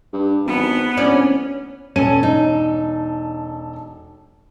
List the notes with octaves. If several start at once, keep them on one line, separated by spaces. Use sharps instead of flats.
G2
G#1 B3
D1 C#4 D5
E1 C#4 A4 D#7
D#4